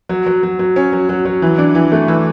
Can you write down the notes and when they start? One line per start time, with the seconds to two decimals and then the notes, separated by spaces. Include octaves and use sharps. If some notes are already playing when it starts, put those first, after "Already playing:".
0.09 F#3
0.27 F#3
0.43 F#3
0.59 F#3
0.76 C#4
0.93 F#3
1.09 F#3
1.25 F#3
1.42 E3
1.58 D4
1.75 E3
1.92 A3
2.08 E3